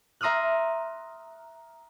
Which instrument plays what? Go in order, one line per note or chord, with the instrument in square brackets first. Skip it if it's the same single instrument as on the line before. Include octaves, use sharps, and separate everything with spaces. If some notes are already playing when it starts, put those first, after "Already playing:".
[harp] E5 A#5 C6 D#6 F6 F#6